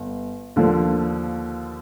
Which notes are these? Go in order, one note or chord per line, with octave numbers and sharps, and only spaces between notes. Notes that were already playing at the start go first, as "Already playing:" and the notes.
Already playing: G1
D#2 D3 F3